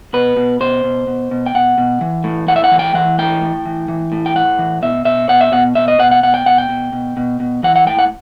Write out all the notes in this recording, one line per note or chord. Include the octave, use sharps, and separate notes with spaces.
B2 B4
B2
B2 C5
B2
B2
B2
G5
B2 F#5
B2
E3
A2
A2 F#5
E5
F#5
E3
G5
E3 F#5
A2 G5
A2
E3
E3
A2
G5
A2 F#5
E3
B2 E5
B2 E5
B2 F#5
E5
B2 F#5
B2 E5
D#5
B2 F#5
F#5
B2 F#5
G5
B2 F#5
G5
B2
B2
B2
B2
E3 F#5
F#5
A2 G5
F#5